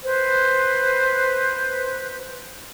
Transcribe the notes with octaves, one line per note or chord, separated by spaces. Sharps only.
B4 C5